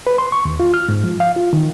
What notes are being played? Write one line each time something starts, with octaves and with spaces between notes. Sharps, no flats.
B4
C6
C#6
D#2
F4
F6
G#2
F3
F5
F4
D#3